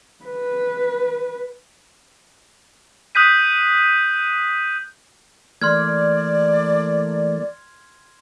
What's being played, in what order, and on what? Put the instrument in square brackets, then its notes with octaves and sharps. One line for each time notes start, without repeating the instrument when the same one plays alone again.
[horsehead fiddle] B4
[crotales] D#6 F#6 G6 B6 D#7
[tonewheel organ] E3 A3 A#3 [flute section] D5 [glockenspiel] C6 F6 G#6